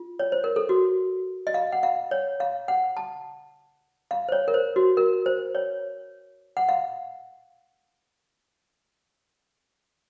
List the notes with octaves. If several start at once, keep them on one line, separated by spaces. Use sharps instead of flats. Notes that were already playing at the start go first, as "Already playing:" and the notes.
Already playing: F4
C#5
C5
A#4
A4
F#4
D#5
F5
F#5
F5
C#5
F5
F#5
A5
F5
C5
C#5
A#4
C5
F#4
A#4
C5
C#5
F#5
F5